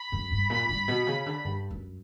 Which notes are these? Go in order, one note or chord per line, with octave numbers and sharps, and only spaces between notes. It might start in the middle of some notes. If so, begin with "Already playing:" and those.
Already playing: B5
F#2
G2
A#2
G2
B2
C#3
D3
G2
F#2